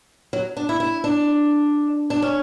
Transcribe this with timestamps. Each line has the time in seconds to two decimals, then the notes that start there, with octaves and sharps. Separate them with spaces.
0.33 F#3
0.57 D4
0.69 E4
0.80 E4
1.04 D4
2.10 D4
2.22 C#4